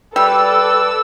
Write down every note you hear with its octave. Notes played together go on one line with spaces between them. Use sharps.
G3 A4 B4 D5 E6